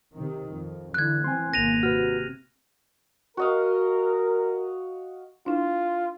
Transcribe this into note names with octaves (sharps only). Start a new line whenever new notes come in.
C3 D#3
F2
D3 E3 F#6 G#6
E3 C4 G#5 C6
G#1 B2 A#3 A#6 D#7 F7
C3 F#4 B4 F6
F#4 A#4 D#5 F5
D4 E4 F4